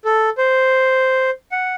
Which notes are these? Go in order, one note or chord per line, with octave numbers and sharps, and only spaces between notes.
A4
C5
F#5